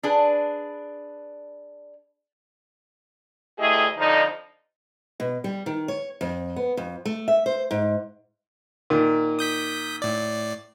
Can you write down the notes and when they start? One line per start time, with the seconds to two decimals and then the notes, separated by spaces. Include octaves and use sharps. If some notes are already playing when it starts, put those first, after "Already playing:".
0.03 D4 G#4 B4
3.59 D2 A3 E4 G4 G#4 D#5
3.98 F2 D3 F3 D#4
5.20 B2
5.44 G3
5.66 D#3
5.88 C#5
6.21 F2
6.56 B3
6.77 F2
7.05 A3
7.28 E5
7.46 C5
7.71 G#2
8.90 A#2 D#3
9.39 D#6 G6 B6
10.02 A2 D5